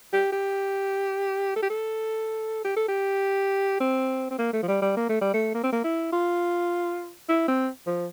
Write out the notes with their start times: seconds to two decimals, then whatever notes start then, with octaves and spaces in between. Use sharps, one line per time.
0.13 G4
0.32 G4
1.56 A4
1.63 G4
1.70 A4
2.65 G4
2.77 A4
2.89 G4
3.80 C4
4.31 C4
4.39 A#3
4.53 A3
4.63 F3
4.68 G3
4.82 G3
4.97 A#3
5.09 A3
5.21 G3
5.34 A3
5.55 A#3
5.64 C4
5.72 A#3
5.84 E4
6.13 F4
7.29 E4
7.48 C4
7.87 F3